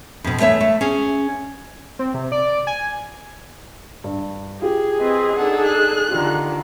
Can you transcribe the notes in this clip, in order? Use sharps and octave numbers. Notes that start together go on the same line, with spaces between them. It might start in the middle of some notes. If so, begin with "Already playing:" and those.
F2 B2
E2 A3 C#5 E5
A3
C#4 G#4
C4
C3
D5
G#5
G2
F4 G4 G#4
C4 B4 D#5
D4 D#4 A4 F#5
F#6
D3 D#3 F4 G4 A#5